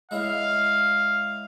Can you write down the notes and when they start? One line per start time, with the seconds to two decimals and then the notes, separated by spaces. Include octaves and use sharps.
0.11 G#3 E4 C#5 F5